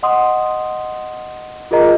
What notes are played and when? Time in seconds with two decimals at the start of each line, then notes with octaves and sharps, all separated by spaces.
0.03 D#5 F#5 C6 D#6
1.71 F4 G#4 A#4 D#5 A#5